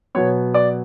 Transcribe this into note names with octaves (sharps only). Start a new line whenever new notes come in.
B2 F#3 B3 C#5
D5